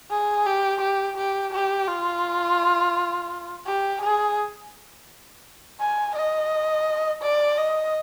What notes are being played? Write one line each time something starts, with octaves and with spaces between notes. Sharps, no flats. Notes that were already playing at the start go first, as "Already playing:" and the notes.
G#4
G4
G4
G4
G4
F4
G4
G#4
G#5
D#5
D5
D#5